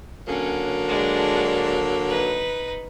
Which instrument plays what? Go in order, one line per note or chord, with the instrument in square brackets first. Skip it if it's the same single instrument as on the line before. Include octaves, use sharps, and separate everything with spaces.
[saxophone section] D3 F#3 A#3 [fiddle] C#4
[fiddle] G#3 D4
D#4 B4